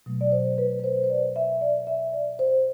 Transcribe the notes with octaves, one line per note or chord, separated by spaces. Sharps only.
B2 F#3 A3
D5
C5
B4
B4
C5
C5
D5
E5
D5
E5
D5
C5